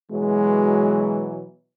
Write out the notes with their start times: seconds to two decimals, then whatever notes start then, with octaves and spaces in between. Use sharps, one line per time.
0.11 B2 E3 F#3 G#3